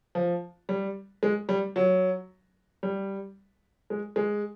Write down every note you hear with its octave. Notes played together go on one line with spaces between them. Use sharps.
F3
G3
G#3
G3
F#3
G3
G#3
G#3